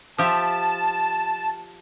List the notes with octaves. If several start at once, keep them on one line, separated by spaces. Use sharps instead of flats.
F3 G4 E5 A5